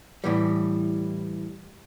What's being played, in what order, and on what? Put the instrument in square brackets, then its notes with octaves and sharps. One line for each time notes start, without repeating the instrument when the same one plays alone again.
[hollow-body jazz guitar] A2 E3 G3